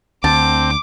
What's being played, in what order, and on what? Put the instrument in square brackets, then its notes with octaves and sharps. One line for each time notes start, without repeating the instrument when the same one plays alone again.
[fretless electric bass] D2 [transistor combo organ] C4 [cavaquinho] A5 [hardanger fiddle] D6